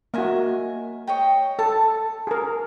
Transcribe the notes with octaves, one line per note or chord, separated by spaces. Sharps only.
A#3 F#4 D#5 E5 G#5
C#5 D#5 G5
A4 A5
G#4 A#4